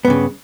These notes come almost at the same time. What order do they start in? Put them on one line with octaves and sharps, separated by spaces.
B3 G2 C#3